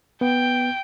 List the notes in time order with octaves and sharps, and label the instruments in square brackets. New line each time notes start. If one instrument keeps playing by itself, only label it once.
[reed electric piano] B3 [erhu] G5